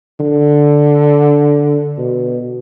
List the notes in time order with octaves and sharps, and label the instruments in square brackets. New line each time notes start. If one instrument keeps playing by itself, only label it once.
[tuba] D3
B2